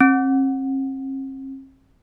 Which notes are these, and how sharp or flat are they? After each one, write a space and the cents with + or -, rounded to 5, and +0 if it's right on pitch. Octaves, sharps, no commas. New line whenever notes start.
C4 +45